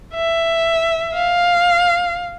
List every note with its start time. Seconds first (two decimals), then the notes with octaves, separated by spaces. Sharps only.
0.13 E5
1.14 F5